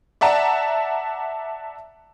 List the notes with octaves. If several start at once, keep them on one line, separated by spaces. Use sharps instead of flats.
D5 E5 F#5 A5 A#5